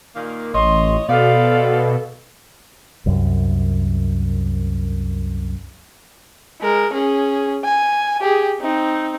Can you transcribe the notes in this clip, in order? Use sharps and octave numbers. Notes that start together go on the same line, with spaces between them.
A#2 D#3 A#3
A1 C#5 D#5 C6
B2 B3 A4 C5 D5 F5
C2 F#2
G#3 A#4
C#4 G#4
G#5
G4 G#4
C4 D#4